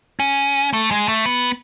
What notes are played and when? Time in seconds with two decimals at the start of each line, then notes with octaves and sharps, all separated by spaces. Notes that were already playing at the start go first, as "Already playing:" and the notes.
0.20 C#4
0.73 A3
0.91 G#3
1.08 A3
1.26 B3